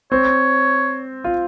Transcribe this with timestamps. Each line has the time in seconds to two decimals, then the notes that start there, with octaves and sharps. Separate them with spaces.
0.12 C4 C#5
1.24 F4